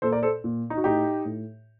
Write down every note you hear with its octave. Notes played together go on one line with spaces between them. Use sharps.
A#2 A4 C5
A#4 D5
A4 C5
A#2
D#4
F#4
A2 D#4 G4
A2